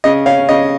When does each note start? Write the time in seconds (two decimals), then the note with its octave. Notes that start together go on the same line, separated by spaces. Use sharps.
0.04 C#3 D#5
0.26 C#4 F5
0.49 C#3 D#5